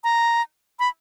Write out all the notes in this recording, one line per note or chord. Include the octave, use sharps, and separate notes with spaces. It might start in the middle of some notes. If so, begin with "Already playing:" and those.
A#5
B5